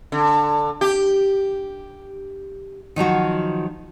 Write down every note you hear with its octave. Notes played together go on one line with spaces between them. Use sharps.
D3
G4
D#3 F3 F#3 F#4